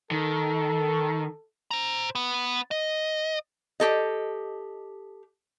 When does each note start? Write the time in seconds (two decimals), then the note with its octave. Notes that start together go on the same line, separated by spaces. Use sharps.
0.11 D#3 A4
1.71 C5 A#5
2.15 B3
2.71 D#5
3.80 G4 A4 D#5